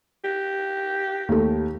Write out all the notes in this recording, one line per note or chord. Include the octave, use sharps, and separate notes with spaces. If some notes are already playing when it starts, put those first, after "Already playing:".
G4
D#2 A3